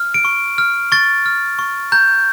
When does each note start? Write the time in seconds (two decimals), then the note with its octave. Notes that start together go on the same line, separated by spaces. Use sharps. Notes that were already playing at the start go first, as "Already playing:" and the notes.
Already playing: F6
0.14 D7
0.25 C#6
0.58 F6
0.92 C#6 A6
1.26 F6
1.59 C#6
1.92 A#5 G6